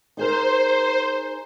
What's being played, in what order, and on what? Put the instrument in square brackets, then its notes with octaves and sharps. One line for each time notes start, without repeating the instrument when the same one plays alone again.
[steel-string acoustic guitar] D#4 G#4 A#4 [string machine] C5